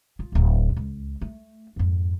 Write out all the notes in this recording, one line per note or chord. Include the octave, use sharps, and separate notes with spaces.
F4
D1 C2
C#2
A3
F2 G#2